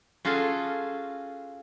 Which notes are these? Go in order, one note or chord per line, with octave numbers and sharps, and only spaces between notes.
C#4 F4 F#4 G#4 A4